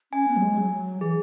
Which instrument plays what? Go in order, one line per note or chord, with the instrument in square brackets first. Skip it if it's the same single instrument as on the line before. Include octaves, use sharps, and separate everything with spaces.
[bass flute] C#4 [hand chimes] G#5
[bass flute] B3
F#3
G#3
F#3
[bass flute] E3 [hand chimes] G#4